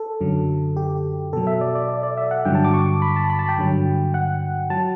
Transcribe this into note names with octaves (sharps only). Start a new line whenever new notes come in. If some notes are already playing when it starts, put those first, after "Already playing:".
Already playing: A4
F#2 D3 F#3
G4
B2 F#3 A4
E5
D5
D5
D5
D5
E5
F#5
G2 D3 F#3 G5
A5
D6
C#6
B5
A5
B5
A5
G5
G2 D3 F#3
F#5
F#3 A5